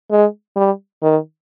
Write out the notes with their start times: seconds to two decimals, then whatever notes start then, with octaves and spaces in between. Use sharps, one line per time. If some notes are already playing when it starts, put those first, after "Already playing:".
0.11 G#3
0.56 G3
1.03 D#3